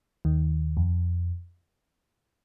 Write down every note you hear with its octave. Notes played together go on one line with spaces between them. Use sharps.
D#2 D#3
F2